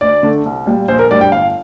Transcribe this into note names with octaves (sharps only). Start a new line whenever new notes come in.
D2 D5
D3 A3
C2
A#2 G3
A#1 C5
A#4
A2 G3 D4 D5
G5
G1 F5